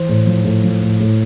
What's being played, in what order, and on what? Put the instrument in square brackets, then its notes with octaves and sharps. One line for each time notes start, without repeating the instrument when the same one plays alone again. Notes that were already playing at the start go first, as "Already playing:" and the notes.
Already playing: [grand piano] E3 C5
A2
F3
A2
F3
A2
A2